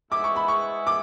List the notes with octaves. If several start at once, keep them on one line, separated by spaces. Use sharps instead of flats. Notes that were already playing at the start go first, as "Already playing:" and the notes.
G#2 G#3 B3 E4 D6
C#6
B5
C#6
D6